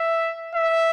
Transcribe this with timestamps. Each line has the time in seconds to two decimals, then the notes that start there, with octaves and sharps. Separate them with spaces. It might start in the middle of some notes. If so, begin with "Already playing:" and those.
Already playing: E5
0.55 E5